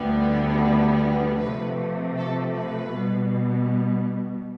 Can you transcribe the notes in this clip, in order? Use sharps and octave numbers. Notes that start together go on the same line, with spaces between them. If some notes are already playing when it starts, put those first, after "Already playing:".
Already playing: D2 D3 G3 B3
C3 F3 A3 B4
A4
B4
B2 G3 B3